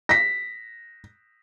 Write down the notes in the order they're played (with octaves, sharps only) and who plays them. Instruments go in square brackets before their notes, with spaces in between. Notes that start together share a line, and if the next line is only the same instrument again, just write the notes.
[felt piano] A#6 B6